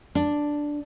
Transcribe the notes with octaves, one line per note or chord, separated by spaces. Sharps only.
D4